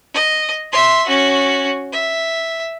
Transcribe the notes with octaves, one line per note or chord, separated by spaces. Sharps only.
D#5
E5 C6
C#4 F#4
E5